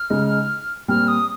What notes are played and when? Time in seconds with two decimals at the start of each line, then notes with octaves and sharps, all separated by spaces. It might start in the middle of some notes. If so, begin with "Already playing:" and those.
Already playing: F6
0.10 C#3 G#3 D#4
0.88 A#2 G3 C4 F6
1.07 D#6